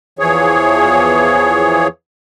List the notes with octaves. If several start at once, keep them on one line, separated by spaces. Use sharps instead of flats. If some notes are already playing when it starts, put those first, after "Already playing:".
E2 E3 F3 G#4 C#5